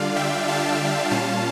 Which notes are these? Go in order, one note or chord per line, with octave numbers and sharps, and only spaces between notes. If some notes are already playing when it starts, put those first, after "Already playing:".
Already playing: D3 G3 D4 F4 D5 F5
E5 G5
F5 A5
A#2 G3 C#4 F4 F5 A5